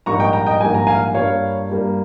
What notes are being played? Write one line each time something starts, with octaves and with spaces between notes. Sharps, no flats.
A#1 G#2 G3 A#3 A#5 C#6
D#5 G5
G5 A#5
D#5 G5
A#1 G#2 G3 A#3 G#5
A#5
F5 G#5
G2 G3 A#3 C#5 F5
G2 G3 A#3